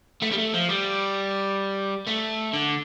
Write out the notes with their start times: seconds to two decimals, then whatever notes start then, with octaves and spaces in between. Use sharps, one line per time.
0.22 A3
0.31 G3
0.38 A3
0.54 F3
0.69 G3
2.07 A3
2.54 D3